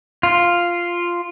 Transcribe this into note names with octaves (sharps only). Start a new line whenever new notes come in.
F4